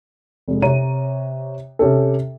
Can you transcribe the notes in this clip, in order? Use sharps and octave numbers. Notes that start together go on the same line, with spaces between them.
F1 G#3
C3 C#5 A#5 D#7
C3 C#4 G4 A4